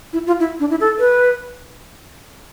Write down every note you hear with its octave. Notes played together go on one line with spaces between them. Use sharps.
E4
F4
E4
D4
E4
A4
B4